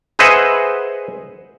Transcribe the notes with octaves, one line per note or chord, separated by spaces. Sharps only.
G#4 B4 C5 D#5 E5 F#5